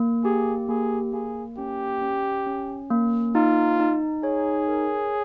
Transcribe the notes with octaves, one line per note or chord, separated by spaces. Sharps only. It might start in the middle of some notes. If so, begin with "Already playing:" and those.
Already playing: A#3
G4 G#4
A#3 G#4
A#3 G#4
C#4 G4
C#4
C#4
A#3
D#4 F4
D#4
G#4 C#5
A#4